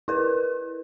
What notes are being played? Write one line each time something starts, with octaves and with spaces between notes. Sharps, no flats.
E4 A#4 B4